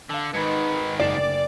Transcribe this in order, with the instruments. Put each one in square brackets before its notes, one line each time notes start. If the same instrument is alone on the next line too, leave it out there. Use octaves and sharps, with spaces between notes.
[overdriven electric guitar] D3 [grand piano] F5 A5
[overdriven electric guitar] G#2 D#3 [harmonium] D#4 B4 [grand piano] G#6 C#7
[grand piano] F#1 C7 E7 [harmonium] D2 [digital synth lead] D5